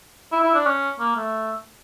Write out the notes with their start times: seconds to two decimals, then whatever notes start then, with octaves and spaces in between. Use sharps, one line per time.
0.32 E4
0.43 E4
0.55 D4
0.66 C#4
0.99 A#3
1.16 A3